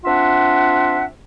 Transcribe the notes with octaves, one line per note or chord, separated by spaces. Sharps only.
C4 D4 F4 E5 F#5